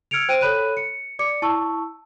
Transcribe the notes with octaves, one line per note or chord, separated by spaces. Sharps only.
E6 F6 G#6 C#7 D7 F7
C5 G5 D7 D#7
A4 C#5 B5 F#6 D#7
C#7
D5 D6 C#7
E4 A5 C#6 E6